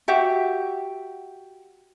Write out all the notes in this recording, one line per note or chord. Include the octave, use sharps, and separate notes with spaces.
F#4 G4 E5 F#5